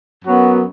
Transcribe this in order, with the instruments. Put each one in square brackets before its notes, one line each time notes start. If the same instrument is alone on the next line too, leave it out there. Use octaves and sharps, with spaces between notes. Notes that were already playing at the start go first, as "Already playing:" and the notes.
[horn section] F#2 F#3 B3 F#4